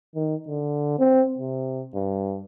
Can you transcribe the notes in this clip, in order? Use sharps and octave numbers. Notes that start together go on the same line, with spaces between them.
D#3
D3
C4
C3
G2